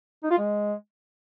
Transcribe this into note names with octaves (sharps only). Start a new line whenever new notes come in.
D#4
F4
G#3